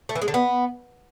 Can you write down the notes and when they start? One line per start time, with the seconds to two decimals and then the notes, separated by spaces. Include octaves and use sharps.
0.09 A3
0.15 E3
0.22 G#3
0.28 D3
0.34 B3